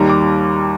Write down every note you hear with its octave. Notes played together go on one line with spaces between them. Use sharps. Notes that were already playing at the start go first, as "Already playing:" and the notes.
Already playing: D#2 D#3 G3 A#5
D6